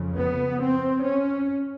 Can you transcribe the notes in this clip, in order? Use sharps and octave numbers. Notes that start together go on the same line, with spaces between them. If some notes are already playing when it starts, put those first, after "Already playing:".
Already playing: F2 C#3
B3
C4
C#4